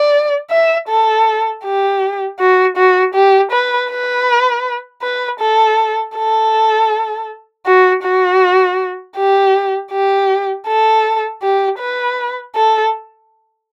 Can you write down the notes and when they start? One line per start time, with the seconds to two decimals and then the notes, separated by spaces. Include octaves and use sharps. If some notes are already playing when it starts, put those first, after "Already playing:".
Already playing: D5
0.51 E5
0.89 A4
1.65 G4
2.39 F#4
2.77 F#4
3.14 G4
3.51 B4
3.90 B4
5.02 B4
5.40 A4
6.16 A4
7.66 F#4
8.04 F#4
9.16 G4
9.91 G4
10.67 A4
11.42 G4
11.79 B4
12.55 A4